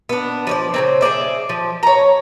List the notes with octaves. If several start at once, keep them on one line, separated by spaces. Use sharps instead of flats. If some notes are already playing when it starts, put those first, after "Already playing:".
B3 D4
F3 C#5 D5
C#3 A#3 C4
G#4 B4 D5 E5
F3
C#5 A#5